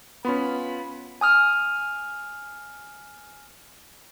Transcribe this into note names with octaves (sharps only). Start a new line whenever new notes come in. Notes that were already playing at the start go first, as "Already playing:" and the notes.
B3 C#4 F4 B5
G#5 D#6 F6